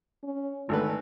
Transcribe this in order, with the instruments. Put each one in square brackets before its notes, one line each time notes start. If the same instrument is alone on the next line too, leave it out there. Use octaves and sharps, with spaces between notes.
[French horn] C#4
[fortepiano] G#1 A3 B4 [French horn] D3